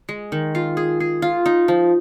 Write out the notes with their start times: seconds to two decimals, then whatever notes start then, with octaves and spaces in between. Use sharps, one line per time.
0.09 G#3
0.32 D#3
0.55 F4
0.77 G#4
1.00 G#4
1.22 F4
1.46 D#4
1.68 F3